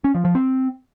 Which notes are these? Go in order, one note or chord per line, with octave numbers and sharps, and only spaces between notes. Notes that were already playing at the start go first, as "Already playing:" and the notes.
C#4
F3
F3
C4